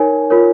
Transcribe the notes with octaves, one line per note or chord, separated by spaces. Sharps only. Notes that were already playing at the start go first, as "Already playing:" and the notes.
Already playing: D#4 A#4 C#5 G#5
F4 A#4 C#5